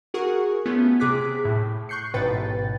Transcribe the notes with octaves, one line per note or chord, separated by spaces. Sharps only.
F#4 G#4 A#4 F#5 C#6
A3 B3 C#4 F4
C3 G#4 D6 F#6 B6
A2
C#6 F#6 G6 C7 C#7
A1 G#2 B2 B4 G5 A6